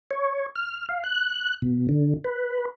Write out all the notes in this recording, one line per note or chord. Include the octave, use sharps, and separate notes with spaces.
C#5
F6
F5
F#6
B2
D3
B4